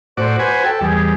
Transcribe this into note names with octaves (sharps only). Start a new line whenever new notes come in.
A2 F#4 C5 D5
F#4 B4 G#5
A4 G5
E2 G3 G#4